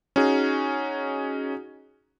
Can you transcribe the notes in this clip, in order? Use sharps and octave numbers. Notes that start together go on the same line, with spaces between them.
C#4 D#4 F#4 G#4